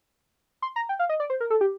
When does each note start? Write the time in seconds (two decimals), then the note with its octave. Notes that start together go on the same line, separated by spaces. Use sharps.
0.62 C6
0.76 A#5
0.89 G5
0.99 F5
1.09 D#5
1.20 D5
1.30 C5
1.40 A#4
1.50 A4
1.61 G4